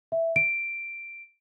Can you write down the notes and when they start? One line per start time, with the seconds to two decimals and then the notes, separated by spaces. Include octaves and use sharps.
0.12 E5
0.36 D7